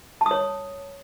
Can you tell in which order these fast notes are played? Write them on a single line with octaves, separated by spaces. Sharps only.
A5 D#6 C#5